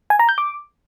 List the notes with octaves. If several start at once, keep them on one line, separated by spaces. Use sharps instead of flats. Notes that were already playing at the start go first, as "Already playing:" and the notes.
G#5
A#5
G6
D6